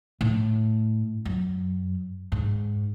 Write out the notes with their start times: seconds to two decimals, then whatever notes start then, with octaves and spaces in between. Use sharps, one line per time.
0.21 A2
1.25 F#2
2.32 G#2